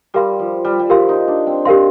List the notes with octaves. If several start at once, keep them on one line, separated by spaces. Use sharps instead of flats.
G3 G4 A#4 F5 C6
F3
G3
G3
F3 G4 A#4 F5 C6
D#4
D4
C4
C4 G4 A#4 F5 C6